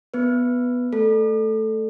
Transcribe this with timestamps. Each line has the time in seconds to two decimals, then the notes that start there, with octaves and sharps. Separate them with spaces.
0.14 B3 B4
0.93 A3 A4